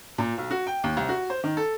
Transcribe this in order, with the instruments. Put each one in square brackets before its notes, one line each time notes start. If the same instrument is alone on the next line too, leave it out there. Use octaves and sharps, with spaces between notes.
[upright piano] A#2
B1
F#4
G5
D#2
C2
F#4
C5
D#3
A4